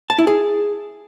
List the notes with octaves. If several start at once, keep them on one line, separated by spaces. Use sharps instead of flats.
A5
E4
G#4